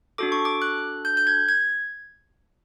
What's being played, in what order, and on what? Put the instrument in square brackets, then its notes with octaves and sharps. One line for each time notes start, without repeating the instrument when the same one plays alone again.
[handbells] D4 F#4 A4 D6
C#6
D6
F#6
G6
G6
G#6
G#6